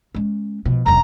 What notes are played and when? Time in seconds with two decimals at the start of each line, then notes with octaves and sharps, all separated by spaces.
0.15 G#3 C#4
0.65 B2 F3
0.86 E1 F#2 A#5